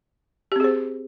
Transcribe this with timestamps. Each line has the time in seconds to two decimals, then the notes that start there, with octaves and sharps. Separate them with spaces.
0.52 G4
0.56 C4
0.60 G#4
0.64 C5